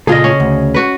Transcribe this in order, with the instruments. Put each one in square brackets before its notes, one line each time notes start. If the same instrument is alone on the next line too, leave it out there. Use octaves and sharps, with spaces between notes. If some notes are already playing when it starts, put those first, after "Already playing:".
[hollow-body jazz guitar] A#2 F4 A4 [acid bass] C#3 [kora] G#4 D#5
[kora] C#4
[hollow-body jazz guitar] D2
[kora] F#4 B4